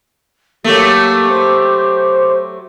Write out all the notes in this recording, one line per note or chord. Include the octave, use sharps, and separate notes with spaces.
F#3 A3 A#3 G4
C5